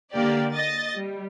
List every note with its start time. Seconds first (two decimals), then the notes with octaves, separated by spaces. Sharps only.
0.14 D3 A#3 G4 D5
0.54 D#5 A6
0.97 G3